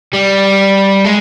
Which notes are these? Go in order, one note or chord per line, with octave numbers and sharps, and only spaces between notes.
G3
G#3